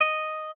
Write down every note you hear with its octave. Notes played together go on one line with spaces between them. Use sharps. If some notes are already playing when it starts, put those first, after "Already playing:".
D#5